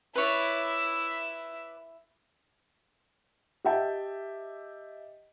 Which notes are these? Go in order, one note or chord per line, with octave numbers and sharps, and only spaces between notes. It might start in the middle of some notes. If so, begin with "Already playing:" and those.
E4 B4 C#5 D5 E5
G4 D#5 E5 G5 A5